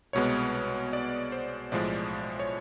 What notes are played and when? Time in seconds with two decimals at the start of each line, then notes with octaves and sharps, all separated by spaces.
0.13 C2 B2 G#3 B3 C#5
0.93 D5
1.32 C5
1.72 B1 A2 F3 G#3 D5
2.40 C#5